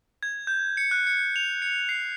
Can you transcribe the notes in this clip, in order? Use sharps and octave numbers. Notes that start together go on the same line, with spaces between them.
G#6
G6
C#7
F#6
C#7
F7
C#7
C7